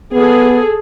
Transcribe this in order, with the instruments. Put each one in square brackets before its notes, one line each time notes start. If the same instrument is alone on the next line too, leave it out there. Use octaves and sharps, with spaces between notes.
[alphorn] B3 [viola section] G#4 A4